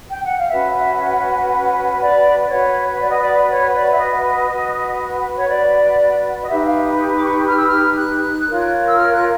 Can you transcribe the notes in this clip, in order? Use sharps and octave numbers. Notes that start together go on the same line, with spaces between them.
G5
F#5
F5
C#4 F#4 B4 E5
E5
D5
D5
F#4 B4 C#5
D5
D#5
D5
C#5
D5
E5
D#5
F#4 B4
C#5
D5
D#5
D#4 G4 B4 E5
E5
F5
D6
C#6
F6
E6
F6
F#6
F4 A#4 C#5
E6
F6
F#6